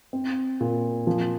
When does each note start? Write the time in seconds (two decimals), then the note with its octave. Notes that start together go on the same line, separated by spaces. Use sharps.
0.13 C4
0.60 A#2
1.07 F3